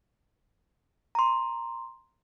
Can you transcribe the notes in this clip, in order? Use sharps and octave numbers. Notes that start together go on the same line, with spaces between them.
A#5 C6